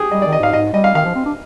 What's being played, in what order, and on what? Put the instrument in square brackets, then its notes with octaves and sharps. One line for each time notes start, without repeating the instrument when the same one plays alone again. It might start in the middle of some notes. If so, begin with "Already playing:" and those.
Already playing: [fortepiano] G4 G#4
[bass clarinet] G3 [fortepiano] D#5
[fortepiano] D5
[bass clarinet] D#3
[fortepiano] D#5
[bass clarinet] G#2 [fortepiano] F5
[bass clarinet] G#2 [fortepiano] D#5
[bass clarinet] G3 [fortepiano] D#5
[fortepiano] F5
[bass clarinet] D#3 [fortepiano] F5
[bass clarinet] F3
C4
D4